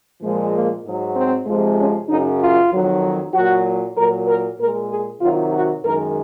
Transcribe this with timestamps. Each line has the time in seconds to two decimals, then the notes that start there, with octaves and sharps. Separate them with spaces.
0.22 A#2 F3 G#3
0.53 A#3
0.84 G#2 F#3
1.16 C4
1.47 F2 C3 F3 G#3
1.78 C#4
2.09 F#2 C#3 F#3 D#4
2.41 F4
2.72 F2 D#3 F#3
3.34 A#2 F#3 F#4
3.97 A#2 F#3 A#4
4.28 A#4
4.59 A#2 G#3 A#4
4.90 G#4
5.22 C3 D#3 F#3 F4
5.53 F#4
5.84 F#2 D#3 G#3 A#4